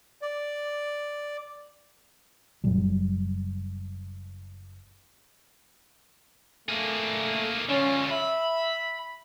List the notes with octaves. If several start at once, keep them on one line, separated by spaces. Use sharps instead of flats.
D5
F#1 A#2 F#3 G3
A3 A#3 G#4
D3 C#4 F4
E5 B5